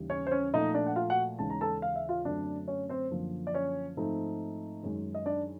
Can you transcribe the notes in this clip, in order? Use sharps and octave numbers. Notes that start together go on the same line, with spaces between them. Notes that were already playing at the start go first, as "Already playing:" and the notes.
Already playing: D#2 C#3 E3 G3
C#4 C#5
C5
C#4 C#5
A#2 F3 A3 D#4 D#5
D4 D5
F#5
F4 F5
F#4 F#5
D#2 C#3 E3 G#3 C#4 A5
A#5
A4 A5
F5
E5
F4 F5
F#2 D3 F#3 A3 C4 D4 D5
C#4 C#5
C4 C5
F#2 D3 F3 A#3
D5
C#4 C#5
G#2 F3 A3 C4 D#4
F#2 D#3 G#3
D#5
D4 D5